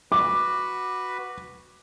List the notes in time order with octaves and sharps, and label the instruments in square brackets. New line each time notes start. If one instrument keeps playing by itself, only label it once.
[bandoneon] F#4 B4 [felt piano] D6